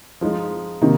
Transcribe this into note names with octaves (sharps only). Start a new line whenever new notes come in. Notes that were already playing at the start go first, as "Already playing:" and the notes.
F3 G#3 D#4
C3 D#3 A#3 D#4